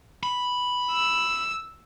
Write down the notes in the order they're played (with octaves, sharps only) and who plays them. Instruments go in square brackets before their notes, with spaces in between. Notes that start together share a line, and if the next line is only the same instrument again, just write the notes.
[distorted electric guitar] B5
[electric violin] E6